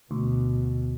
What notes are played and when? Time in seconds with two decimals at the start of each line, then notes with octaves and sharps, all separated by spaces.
0.11 D2 B2